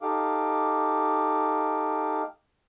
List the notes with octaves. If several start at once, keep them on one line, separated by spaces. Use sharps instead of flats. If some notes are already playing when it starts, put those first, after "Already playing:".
D#4 G4 A4 F5 D6